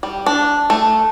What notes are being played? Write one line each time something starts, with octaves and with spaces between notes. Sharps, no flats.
G3
D4
A3